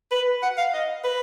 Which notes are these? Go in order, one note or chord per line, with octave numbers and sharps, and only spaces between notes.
B4
F#5
F5
D#5
B4